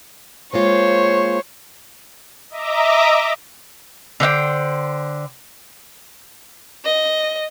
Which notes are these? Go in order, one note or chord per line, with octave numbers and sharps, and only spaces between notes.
G#3 A#3 F4 C5 C#5
D#5 E5 A#5 D6
D3 C5 E5 G5
D#5